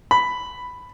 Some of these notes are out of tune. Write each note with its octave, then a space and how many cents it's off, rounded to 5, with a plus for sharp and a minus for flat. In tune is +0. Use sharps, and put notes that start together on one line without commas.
B5 +5